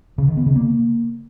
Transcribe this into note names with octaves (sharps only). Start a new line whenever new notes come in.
C#3
D#3
B3
C#3
A#3